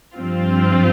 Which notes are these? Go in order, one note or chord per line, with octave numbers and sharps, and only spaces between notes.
G2 F3 C4 F4